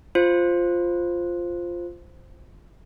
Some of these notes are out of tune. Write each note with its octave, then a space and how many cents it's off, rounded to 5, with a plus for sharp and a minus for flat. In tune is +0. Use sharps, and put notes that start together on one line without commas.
F4 +0 C5 +0